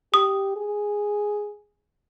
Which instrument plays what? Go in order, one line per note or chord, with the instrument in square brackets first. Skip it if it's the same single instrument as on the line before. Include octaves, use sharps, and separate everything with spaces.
[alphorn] G4 [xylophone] D#6
[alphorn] G#4